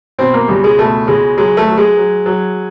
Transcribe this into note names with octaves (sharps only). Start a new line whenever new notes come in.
B2 C4
A#3
C#2 G3
G#3
B2 A3
C#2 G#3
F#3 G#3
A3
F#3
G#3
F#3
F#3